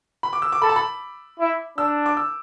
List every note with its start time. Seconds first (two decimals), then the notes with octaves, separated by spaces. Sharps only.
0.23 B5
0.33 D6
0.42 E6
0.52 D6
0.62 A4 B5
0.69 A5
0.76 B5
1.40 E4
1.78 D4 E6
2.06 D6
2.17 E6